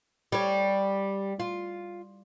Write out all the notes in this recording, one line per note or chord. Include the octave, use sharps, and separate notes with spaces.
G3 C#5
F4